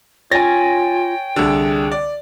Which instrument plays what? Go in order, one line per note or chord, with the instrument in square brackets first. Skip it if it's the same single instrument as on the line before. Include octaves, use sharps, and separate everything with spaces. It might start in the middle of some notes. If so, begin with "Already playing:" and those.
[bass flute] F4 [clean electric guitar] C#5 G#5 [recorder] G5 [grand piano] A6 A#6
[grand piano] C2 D3 [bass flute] G#4
[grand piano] D5